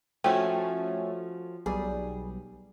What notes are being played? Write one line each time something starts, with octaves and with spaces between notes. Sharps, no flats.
F3 A3 C#4 F#4 G5 G#5
B1 G3 G#4